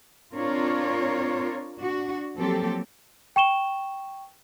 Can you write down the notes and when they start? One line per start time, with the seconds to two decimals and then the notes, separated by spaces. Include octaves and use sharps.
0.35 C4 D4 F4 A#4 C#5
1.77 D4 F#4
2.35 F3 F#3 A#3 C4 G4 A4
3.36 G5 C#6 E7 G7